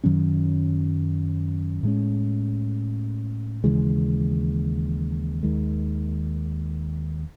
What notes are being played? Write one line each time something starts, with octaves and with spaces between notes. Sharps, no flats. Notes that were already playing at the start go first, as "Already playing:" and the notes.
F#2 D#3 F#3 C#4
A2 G#3 C#4
D#2 C#3 E3 G#3
D#2 D#3 G#3